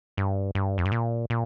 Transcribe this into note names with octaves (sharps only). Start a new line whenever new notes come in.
G2
G2
F2
G2
A#2
A#2